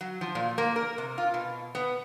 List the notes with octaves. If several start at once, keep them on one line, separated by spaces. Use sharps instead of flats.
F#3
F3
A#2
A#3
A#4
C3
F4
B2
B3